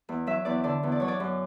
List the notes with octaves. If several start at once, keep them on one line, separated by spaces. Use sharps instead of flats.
E2
F#3 E5
E2 D5
D3 D5
E2
D5
F#3 C#5
D5
F#2